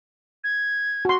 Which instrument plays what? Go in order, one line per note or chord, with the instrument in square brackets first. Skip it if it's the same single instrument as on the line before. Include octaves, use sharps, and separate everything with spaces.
[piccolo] G#6
[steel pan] F#4 C6